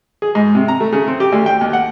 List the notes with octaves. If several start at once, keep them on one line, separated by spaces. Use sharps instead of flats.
G#4
G#2
C3
A#5
A3
C#3
C4
G4
D2
G5
D#2
F#5